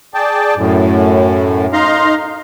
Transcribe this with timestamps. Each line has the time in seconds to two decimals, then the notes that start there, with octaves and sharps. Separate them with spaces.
0.14 G#4 D5 G5 A5
0.56 F#2 A2
1.73 D#4 F5 A#5 C6